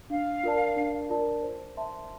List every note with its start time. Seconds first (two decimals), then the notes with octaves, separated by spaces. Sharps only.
0.10 D4 F5
0.43 F4 A#4 D5 A5
0.76 D4
1.10 F4 A#4 D5 A5
1.43 C5
1.77 E5 A5 C6